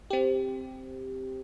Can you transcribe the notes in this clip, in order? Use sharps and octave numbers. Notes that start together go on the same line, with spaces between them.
C4 G4